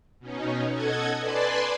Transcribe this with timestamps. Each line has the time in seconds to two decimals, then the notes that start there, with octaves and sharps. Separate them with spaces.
0.19 B2 C#4 D#4
0.70 A4 D#5 F#5 G#6
1.19 B4 D5 G#5 A5 B5 C6